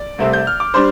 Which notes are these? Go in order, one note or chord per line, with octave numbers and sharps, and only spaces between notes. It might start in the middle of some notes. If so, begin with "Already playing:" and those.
Already playing: D5
C2 C3 A3 C4
G6
F6
D6
G3 D4 C5 C6